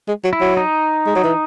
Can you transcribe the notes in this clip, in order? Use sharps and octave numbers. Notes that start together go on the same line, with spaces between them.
G#3
F#3
E4
F#3
D#4
G#3
F#3
E3